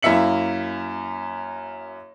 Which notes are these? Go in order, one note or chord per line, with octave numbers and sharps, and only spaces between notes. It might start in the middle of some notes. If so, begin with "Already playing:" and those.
F#2 A#3 E4 E5 C#7 F#7